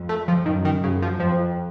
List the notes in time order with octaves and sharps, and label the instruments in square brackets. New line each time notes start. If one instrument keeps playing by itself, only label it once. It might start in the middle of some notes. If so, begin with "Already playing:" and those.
Already playing: [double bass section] F2
[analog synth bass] A3
F3
[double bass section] F#2 [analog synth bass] D#3
[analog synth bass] D#3
[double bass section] F#2 [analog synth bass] C#3
[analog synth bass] F3
[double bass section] F2 [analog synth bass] F3